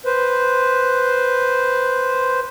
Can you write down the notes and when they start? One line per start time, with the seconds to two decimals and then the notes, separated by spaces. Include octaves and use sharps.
0.05 B4 C5